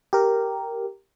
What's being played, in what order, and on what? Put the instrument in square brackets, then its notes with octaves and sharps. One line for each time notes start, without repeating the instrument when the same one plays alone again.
[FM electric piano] G4 A#4